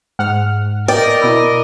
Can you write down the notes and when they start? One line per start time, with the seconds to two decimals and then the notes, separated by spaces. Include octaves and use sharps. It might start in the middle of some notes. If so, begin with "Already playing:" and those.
0.19 G#2 F#5 F6
0.88 A#4 D5 D#5 G5
1.21 B2 E4